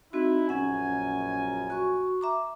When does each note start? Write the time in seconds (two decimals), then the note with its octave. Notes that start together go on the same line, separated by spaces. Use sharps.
0.13 C4 D#4 E4 F#4
0.49 A#1 F#2 C#4 F#5 G#5
1.70 F#4 C#6
2.21 E5 A#5 D6